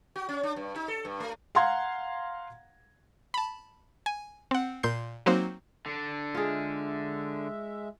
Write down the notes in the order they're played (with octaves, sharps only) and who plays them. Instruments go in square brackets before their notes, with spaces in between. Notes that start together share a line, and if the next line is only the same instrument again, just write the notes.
[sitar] F#4
C#4
D4
G2
D#4
A4
G2
A3
[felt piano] F5 F#5 A#5 C6 G#6
[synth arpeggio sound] A5 B5
G#5
C4 F#5
A#2 C6 G6 C7
F#3 A#3 C4 D#4 F#4 C5
[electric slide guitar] D3 D4
[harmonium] G#3 E5 [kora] F4 G#4